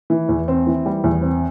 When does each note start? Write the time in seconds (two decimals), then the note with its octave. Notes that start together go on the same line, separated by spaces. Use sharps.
0.10 E3
0.29 E2
0.48 C4
0.67 E3
0.86 G3
1.04 E2
1.22 C4